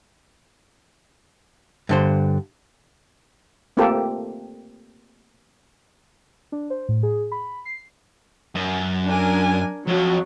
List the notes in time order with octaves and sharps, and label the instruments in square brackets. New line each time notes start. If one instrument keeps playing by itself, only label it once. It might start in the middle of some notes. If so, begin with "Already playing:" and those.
[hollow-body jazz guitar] G2 D3 C5
[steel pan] A3 A#3 C4 F4 G4 A4
[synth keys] D4
C5
A2
G#4
B5
C7
[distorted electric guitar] F#2
[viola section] D4 A#4 G#5
[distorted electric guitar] F2 [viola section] F#3